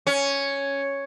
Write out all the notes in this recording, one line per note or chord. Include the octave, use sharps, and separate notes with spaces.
C#4